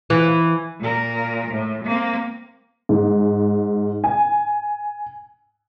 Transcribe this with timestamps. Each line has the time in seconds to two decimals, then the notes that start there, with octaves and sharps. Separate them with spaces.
0.10 E3
0.80 A#2 A#4
1.51 A2
1.85 A#3 C4
2.89 G#2
4.04 G#5